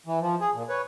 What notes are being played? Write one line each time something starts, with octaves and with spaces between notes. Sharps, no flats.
E3
F3
G#4
A#2
B4 C#5